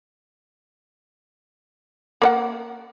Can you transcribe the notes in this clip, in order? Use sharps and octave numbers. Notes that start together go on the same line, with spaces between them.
A#3 D5 F#5